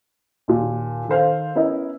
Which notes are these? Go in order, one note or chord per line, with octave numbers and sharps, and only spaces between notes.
D#2 A#2
D#3 A4 C5 F5
B3 C#4 E4 A#4 D#5